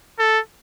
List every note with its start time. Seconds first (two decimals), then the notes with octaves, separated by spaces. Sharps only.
0.19 A4